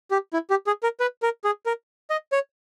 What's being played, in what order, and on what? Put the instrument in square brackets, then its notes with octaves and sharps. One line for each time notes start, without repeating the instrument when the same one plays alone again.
[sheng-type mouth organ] G4
E4
G4
G#4
A#4
B4
A#4
G#4
A#4
D#5
C#5